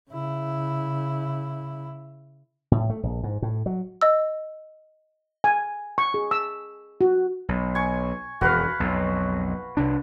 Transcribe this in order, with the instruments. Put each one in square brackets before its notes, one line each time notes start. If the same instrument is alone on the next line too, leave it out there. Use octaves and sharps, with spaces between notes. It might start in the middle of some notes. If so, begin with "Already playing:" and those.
[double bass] C#3 E4
[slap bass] A2
A3
A#1
G#2
A2
F#3
[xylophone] D#5 E6
[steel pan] G#5
C#6
G#4
E6
F#4
[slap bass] B1
[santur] G#5 C#6
[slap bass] E1 F2 [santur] F#4 B4 F5
[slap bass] B1 F2
C2 C3 D4